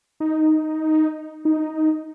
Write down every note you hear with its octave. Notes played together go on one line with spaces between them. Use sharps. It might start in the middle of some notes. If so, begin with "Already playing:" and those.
D#4
D#4